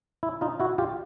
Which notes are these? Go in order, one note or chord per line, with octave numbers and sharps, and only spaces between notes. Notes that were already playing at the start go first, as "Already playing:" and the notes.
E4
D#4 F4
E4 F#4
F4 G4